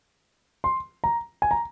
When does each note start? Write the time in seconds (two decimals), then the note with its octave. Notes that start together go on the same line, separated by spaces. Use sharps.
0.64 C6
1.04 A#5
1.42 G#5
1.51 A#5